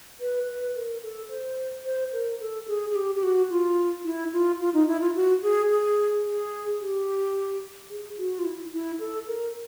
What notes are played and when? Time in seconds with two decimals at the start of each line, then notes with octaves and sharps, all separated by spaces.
0.20 B4
0.48 B4
0.75 A#4
1.03 A4
1.30 C5
1.85 C5
2.13 A#4
2.40 A4
2.68 G#4
2.90 G#4
2.95 G4
3.15 G4
3.23 F#4
3.50 F4
4.05 E4
4.33 F4
4.60 F4
4.74 D#4
4.88 E4
5.01 F4
5.15 F#4
5.43 G#4
5.70 G#4
6.26 G#4
6.80 G4
7.90 G#4
8.18 F#4
8.39 F4
8.45 E4
8.72 E4
9.00 A4
9.27 A#4